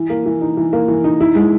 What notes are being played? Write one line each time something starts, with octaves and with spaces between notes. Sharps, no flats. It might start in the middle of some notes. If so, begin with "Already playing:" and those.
Already playing: E3
A#3
E3
D#4
E3
A#3
E3
D#4
E4
G#3